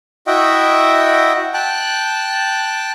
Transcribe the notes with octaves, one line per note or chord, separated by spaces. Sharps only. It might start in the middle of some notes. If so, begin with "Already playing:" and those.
E4 F#4 D#5 E5 F#5 G5
G5 A5 F#6